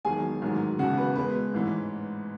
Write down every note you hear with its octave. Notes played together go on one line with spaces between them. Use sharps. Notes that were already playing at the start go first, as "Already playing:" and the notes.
E1 E2 D#3 F#3 G#4 G#5
A1 G#2 D#3 F#3
E1 E2 C#3 F#4 F#5
B4
E2 B2 G#3 B4
A1 G#2 E3